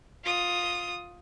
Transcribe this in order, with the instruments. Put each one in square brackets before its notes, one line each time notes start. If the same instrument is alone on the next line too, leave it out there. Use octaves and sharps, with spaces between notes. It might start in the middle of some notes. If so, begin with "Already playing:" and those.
[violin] F4 D#6